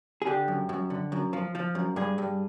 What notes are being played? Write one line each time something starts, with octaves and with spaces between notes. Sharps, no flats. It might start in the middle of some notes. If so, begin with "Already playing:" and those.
G#4
D3 G4
F#2
F#2
D3
F#2
F3
F3
F#2
G2 G#4
G2